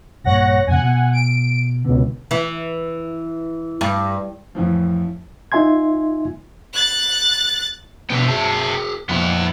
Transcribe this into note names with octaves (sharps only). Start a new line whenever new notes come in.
A#1 G2 A#2 C#5 F#5 A#6
F2 A#2 C#3 F#5 G#5
B2
D7
C#2 B2 D3
E3
G2
F2 A2 E3 F3
D#4 F4 E5 G#5 C6 G#6
F#6 A6
B2 D3 B3 E5 G5
F#4 G#4 A5
F2 A#2 B3 E4